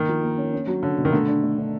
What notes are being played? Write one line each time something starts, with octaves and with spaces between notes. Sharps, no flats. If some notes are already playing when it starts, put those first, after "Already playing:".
Already playing: D#3 A#3
F3
A#3
C#4
C#4
F#3
D3 C#4
B2
D#3
D3 A3
D4
A3
D4